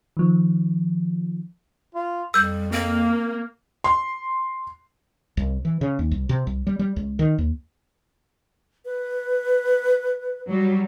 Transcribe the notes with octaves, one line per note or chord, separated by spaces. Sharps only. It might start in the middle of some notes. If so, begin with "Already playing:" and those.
D#3 F3
F4
F2 G3 E6 G6
A#3 C4
C6
C2
E3
C#3
D#2
C2
C3
C2
G3
G3
C#2
D#3
D#2
B4
F#3 G3